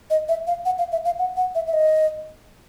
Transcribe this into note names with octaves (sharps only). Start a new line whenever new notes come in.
D#5
E5
F5
F#5
F5
E5
F5
F#5
F#5
E5
E5
D#5